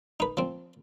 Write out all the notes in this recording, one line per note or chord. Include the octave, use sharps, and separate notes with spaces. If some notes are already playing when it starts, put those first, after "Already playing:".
D#4 B4
F3 C4